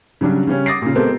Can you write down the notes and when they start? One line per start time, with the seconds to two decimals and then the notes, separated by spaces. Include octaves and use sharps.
0.21 C#3 F#3 G3 D4
0.47 C#3 G3 C#4
0.66 D6 D#6 A6 A#6 C7
0.82 A#2 C#3
0.95 G#3 B3 C4 G4 A4 A#4